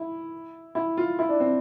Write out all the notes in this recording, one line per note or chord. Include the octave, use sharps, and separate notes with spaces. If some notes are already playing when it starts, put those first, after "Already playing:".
Already playing: E4
E4
F4
E4
D4
C4